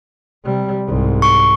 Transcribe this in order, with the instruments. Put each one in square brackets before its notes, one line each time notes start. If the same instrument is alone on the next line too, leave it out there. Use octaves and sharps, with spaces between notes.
[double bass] C3 G3
C2 G#2
[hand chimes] C#6